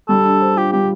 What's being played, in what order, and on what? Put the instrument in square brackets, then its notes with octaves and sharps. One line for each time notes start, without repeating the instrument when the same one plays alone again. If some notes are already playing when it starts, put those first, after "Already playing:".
[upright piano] G3 [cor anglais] A4
[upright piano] D4
C5
[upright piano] F4 [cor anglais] G4
[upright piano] G3 [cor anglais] G4